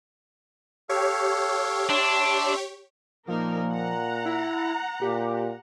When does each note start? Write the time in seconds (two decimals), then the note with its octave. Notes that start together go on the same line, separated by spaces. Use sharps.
0.89 G4 A4 C#5 F5
1.89 D4 E5 C6
3.28 A#2 F3 A#3 D#4 A#4
3.71 F#5 A#5
4.25 E4
5.02 A#2 G4